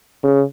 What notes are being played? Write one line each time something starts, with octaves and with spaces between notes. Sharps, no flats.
C#3